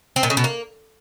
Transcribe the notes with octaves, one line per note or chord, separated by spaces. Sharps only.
C4
A#2
C#3
B2
A#3